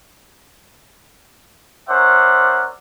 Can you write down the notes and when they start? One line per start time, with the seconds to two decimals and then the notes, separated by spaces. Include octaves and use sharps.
1.89 C#4 A#4 C5 D5 E5 F#5